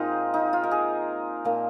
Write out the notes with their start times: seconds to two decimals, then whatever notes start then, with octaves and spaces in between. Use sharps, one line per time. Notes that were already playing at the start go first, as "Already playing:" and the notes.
Already playing: A#2 G#3 C4 D#4 F4 C5
0.34 D#4
0.53 F4
0.64 A#4
0.71 G#4
1.45 A#2 F3 A#3